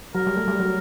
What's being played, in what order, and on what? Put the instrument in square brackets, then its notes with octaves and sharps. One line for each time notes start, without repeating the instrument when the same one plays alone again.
[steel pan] F#3 [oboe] A#4
[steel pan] G3
A3
G3
F#3